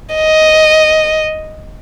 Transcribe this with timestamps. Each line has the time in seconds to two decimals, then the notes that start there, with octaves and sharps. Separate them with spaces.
0.15 D#5